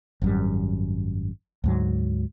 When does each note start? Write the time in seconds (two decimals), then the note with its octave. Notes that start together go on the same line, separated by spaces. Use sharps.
0.22 G#1 F#2 G3
1.64 D2 G#2 F#3